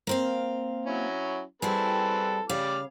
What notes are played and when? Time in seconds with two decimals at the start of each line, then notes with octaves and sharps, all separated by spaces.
0.07 A#3 C4 F5
0.86 F#3 C#4 E4
1.62 G3 C4 E4 G#4 A4 B4
2.49 C#3 G3 F5 D6 F6